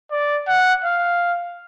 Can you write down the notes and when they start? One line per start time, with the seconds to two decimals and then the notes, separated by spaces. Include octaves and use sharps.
0.11 D5
0.48 F#5
0.84 F5